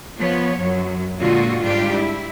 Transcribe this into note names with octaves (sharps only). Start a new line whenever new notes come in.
F3 B3 C#5
F#2 F#3
A#2 D3 G#3 F4 F#4
G#2 G3 D4 F4 G4
E4